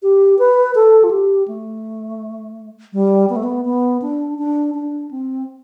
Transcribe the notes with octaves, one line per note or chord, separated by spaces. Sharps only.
G4
B4
A4
F4
G4
A3
G3
B3
A3
B3
B3
D4
D4
D4
C4